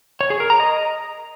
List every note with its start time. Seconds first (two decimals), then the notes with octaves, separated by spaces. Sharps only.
0.21 C#5
0.30 G#4
0.40 A#4
0.50 A#5
0.60 D#5